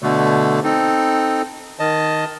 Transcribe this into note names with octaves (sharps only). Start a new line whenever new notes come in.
B2 D3 A3
C4 D#4 A4
D#3 D#5 A5